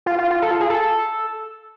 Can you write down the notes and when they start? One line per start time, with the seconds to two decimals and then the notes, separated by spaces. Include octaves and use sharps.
0.06 F4
0.18 F4
0.31 F4
0.42 A4
0.51 F4
0.61 G#4
0.70 A4